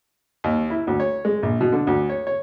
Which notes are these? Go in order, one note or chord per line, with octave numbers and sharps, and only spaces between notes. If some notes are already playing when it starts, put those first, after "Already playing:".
D#2
E4
D2
C#5
G#3
A#1
B2
D3
D2
C#5
C#5